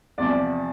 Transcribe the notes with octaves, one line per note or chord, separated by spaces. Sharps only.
E2 C3 F3 D5